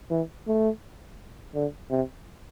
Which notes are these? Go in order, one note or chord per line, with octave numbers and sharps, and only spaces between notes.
E3
A3
D3
C3